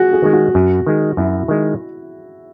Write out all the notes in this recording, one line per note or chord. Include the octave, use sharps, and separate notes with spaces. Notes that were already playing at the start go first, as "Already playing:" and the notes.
Already playing: F#4 G#4
G#4
D#3 G#3
F#4
F#2
D#3 G#3
F#2 E4
D#3 G#3